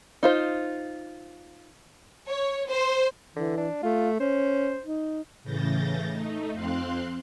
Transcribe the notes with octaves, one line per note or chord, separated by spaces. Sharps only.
D#4 F4 C5
C#5
C5
D3 E3
D4
A3 F4
C#4 C5
D#4
A2 C#3 E3 G6 A6 A#6
A3 D#4
F2 C4 F5 C6 F#6